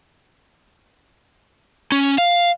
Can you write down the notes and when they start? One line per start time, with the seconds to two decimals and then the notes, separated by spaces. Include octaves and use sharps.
1.92 C#4
2.18 F5